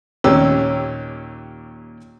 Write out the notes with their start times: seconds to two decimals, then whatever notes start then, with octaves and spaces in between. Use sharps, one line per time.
0.24 D#2 A#2 C#4 G4 E6